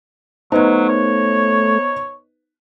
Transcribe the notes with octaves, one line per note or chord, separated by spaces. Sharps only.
F#3 A3 B3 D#4 B4 C5 D#5
C#5